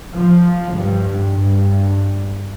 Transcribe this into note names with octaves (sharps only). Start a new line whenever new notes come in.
F3
G2
G2